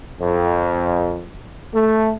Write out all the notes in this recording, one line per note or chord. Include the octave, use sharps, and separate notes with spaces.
F2
A3